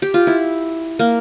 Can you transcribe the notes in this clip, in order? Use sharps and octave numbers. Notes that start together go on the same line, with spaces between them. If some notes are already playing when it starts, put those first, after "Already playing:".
G4
F4
E4
A#3